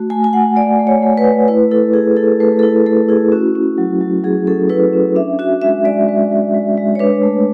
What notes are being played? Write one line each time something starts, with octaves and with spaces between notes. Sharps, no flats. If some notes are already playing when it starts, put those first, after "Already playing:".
Already playing: A3 F#4
A3 G#5
G#5
A3 F#5
A3 D5
A3
C#5
A3
B4
A3
E4 B4
E4 A4
E4 G#4
E4 A4
A3 B4
A4
E4 B4
A3 A4
E4 G#4
C#4 F#4
C#4
F#3
F#3
F#3 G#4
C#4 A4
E4 B4
C#4
D4 E5
F#4 E5
G#3 E5
G#3 D5
G#3
G#3
G#3
G#3
C#5
D4 B4
A3